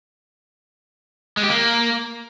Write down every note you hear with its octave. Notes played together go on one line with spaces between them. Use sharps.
G#3
G4
A#3